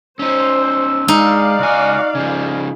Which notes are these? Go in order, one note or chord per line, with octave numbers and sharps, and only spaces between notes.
C#4 D#4 C5 E6
G#3 D#4 D5 F5
C#2 F#4 G#5
C#3 F3 G#5